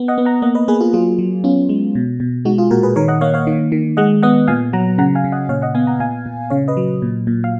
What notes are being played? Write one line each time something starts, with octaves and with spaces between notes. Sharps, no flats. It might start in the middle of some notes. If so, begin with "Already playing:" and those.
Already playing: B3
D#5 F#5
B3
F#5 A#5
A#3 D#5 F#5
B4 D#5
A#3 G#4 B4
F4 G#4
F#3 F4 G#4
F#3
B3 C#4 F4
G#3
B2
B2
G#3 D#4 F#4
F4 G#4
A#2 F#4 A#4
G#4 B4
D#3 A#4 C#5
D#5 F#5
A#3 C#5 F5
C#5 F5
D#3
D#3
G#3 D#5 F#5
B3 D#5 F#5
A#2 F5 G#5
F#3 F#5 A#5
C#3 F#5 A#5
F5 G#5
C#3
D#5 F#5
A#2 C#5 F5
D#5 F#5
B3 F5 G#5
F#5 A#5
A#2 F5 G#5
A#2
C#3 C#5 F5
B4 D#5
F#3
A#2
A#2
F5